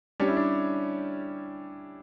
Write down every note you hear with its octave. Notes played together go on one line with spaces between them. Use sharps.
G3 C#4 D4 G4 C#5
E4
D4